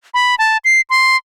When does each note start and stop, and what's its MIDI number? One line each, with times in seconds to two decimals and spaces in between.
0.14 0.35 83
0.39 0.57 81
0.65 0.81 96
0.90 1.17 84